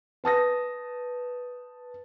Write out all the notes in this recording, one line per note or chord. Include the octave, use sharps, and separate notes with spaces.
B4 A5 D#6 A#6